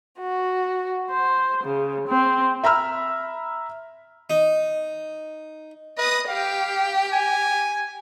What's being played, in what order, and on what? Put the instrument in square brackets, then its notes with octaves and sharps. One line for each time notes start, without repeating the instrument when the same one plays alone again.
[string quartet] F#4
C5
C#3
C4
[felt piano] E5 A#5 B5 E6 F6
[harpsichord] D#4
[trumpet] B4 [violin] D#5 D#6
[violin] G4 G5 [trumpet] F5
[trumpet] G#5